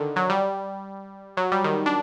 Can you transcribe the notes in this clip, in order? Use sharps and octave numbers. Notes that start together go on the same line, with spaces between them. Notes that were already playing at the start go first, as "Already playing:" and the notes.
Already playing: D3 D#3
F#3
G3
F#3
G3
D#3
D4